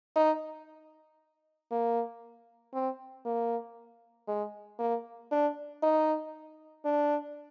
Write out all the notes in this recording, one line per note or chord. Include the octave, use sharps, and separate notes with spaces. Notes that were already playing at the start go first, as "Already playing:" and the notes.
D#4
A#3
C4
A#3
G#3
A#3
D4
D#4
D4